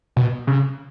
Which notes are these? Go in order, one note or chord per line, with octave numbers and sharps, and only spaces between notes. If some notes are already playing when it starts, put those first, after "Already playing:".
B2
C#3